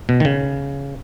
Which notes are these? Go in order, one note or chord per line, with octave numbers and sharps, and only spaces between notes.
B2
D#3
C#3